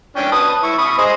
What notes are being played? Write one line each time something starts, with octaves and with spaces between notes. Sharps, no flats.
C#4 D4 G5
B4 A5 D#6
E4 C#6
B5 C#6 D#6
G#4 C5 D#5